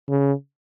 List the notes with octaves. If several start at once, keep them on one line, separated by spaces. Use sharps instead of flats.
C#3